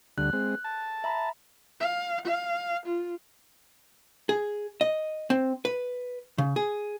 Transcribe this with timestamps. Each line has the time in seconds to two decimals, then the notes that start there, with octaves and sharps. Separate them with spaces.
0.18 D2 D3 G3 F#6
0.33 G#3 C4
0.64 A5
1.04 E5 A#5 B5
1.80 F5
2.25 F5
2.86 F4
4.29 G#4
4.81 D#5
5.30 C4
5.65 B4
6.38 C#3
6.56 G#4